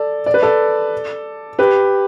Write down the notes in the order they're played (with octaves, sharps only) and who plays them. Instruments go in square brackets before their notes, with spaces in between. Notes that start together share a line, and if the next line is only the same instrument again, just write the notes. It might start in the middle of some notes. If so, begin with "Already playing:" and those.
Already playing: [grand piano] A4 D5
D5
B4
A4 D5
G4 B4